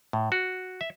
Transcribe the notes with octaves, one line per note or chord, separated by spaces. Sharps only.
A2
F#4
E5